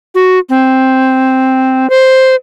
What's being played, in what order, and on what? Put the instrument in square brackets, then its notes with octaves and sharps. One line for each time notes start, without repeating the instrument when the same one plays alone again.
[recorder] F#4
C4
C5